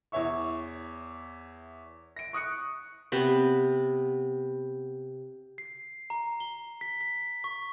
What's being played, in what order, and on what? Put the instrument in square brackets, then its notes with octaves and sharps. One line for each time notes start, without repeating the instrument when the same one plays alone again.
[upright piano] E2 E4 C#5 E5 C#6
A#6 D7
C#6 D#6 F#6 C#7
[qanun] C3 B3
[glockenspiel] C7
A#5
G7
B6
B6
C#6